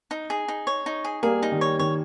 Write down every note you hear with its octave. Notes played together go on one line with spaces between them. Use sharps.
D#4
G#4
D#4
C#5
D#4
G#4
G3 A#3 G#4
D#4
D#3 G3
C#5
D#3 C#5